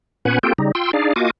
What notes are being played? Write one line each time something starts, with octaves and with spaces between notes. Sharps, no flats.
A#2 B3 C#4 B4 F#5 G#5
A#3 C4 F4 G4 A4 G5
C#3 G3 D#4
F4 G5 C6 E6
D4 D#4 G#4 D5 F5
A#3 F4 F#4 D#5 G#5 D6